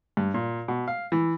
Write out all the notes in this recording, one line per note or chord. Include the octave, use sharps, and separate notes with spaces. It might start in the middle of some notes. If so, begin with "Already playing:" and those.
G2
A#2
B2
F5
E3